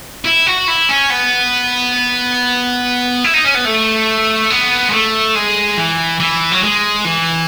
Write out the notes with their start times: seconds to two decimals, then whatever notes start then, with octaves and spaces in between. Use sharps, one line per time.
0.25 E4
0.47 F#4
0.68 E4
0.89 C#4
1.10 B3
3.25 E4
3.34 D#4
3.45 C#4
3.55 B3
3.65 A3
4.50 B3
4.89 G#3
4.93 A3
5.36 G#3
5.78 E3
6.20 E3
6.52 F#3
6.63 G#3
7.05 E3